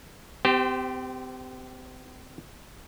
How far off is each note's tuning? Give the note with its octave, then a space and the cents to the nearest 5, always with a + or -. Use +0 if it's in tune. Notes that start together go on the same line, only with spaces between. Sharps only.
C4 -40 G4 +0 C5 -10